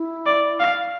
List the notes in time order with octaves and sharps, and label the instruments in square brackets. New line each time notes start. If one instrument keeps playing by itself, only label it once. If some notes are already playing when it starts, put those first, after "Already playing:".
Already playing: [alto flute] E4
[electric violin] D5
F5